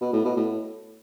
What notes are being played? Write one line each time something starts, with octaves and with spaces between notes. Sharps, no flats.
B2
A2
B2
A2